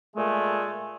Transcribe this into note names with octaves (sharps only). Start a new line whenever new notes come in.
A#2 G#3 A3